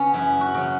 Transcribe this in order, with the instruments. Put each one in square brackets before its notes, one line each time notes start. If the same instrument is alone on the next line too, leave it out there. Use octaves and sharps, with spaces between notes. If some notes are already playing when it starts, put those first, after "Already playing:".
Already playing: [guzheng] C#3 B3 C#4
F#2 E4
F#4
C#3 F#3